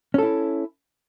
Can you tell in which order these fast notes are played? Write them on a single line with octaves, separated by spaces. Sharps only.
C#4 A4 E4